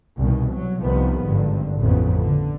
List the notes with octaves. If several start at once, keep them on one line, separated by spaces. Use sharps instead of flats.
C2 B2 D#3
F#3
C2 C3 D#3 F3 B3
G#1 G2 D3
A1 F2 C#3 B3
D3